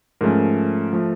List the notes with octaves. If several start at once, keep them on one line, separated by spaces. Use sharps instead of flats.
G#2 F3 A3 C#4 A#4
F3 A3